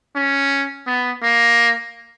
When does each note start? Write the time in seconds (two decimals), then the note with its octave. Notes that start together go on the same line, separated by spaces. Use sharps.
0.16 C#4
0.87 B3
1.23 A#3